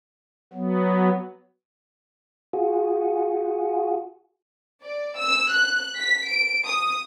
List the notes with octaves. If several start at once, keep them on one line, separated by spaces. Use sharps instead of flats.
F#3 B3
F4 F#4 G#4
D5
E6
F#6
B6
D7
D#6